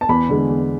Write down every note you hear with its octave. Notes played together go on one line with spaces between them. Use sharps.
A5
E2 B5
D3 G#3
E2